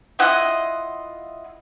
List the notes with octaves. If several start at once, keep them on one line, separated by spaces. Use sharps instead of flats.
E4 F4 D#5 F#5